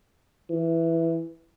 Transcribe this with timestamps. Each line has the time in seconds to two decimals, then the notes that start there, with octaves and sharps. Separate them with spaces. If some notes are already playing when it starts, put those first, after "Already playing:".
0.50 E3